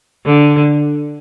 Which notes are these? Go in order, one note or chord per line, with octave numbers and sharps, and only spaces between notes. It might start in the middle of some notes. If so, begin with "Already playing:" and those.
D3